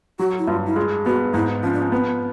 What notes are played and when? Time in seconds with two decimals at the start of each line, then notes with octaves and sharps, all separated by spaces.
0.19 F#3 F#4
0.38 E4
0.48 G2 F4
0.66 E4
0.76 G#3 F4
1.05 B3 F#4
1.34 G#2 E4
1.63 F3 C#4
1.73 D4
1.82 C#4
1.92 B3 C4